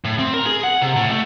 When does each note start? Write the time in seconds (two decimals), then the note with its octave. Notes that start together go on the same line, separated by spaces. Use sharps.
0.05 A2
0.19 C4
0.34 A#4
0.46 G#4
0.63 F#5
0.81 C3
0.96 A2
1.11 A3